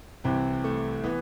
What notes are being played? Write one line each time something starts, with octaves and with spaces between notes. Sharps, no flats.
C2 C3 E3 C4
A3
E3 B3